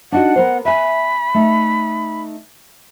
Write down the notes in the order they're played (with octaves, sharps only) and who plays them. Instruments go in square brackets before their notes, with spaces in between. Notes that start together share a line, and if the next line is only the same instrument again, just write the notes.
[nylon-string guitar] D4 D#4 F#4 [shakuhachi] F#5
[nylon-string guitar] B3 A#4 C5
[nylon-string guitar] E5 G#5 [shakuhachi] B5
[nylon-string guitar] A3 D#4